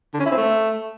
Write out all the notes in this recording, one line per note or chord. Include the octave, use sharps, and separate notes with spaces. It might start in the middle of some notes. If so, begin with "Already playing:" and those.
D3
C#4
E4
C4
A3